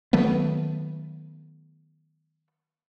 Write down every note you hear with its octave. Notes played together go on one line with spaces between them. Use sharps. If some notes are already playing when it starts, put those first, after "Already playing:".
D#3 F#3 A3 B3